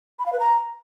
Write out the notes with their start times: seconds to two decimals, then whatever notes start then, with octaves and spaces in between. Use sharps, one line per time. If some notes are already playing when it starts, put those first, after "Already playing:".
0.19 B5
0.26 F5
0.33 B4
0.40 A#5